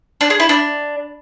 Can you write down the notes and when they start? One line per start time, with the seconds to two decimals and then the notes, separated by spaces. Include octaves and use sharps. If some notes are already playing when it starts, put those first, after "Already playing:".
0.21 D4
0.30 G#4
0.40 E4
0.49 D4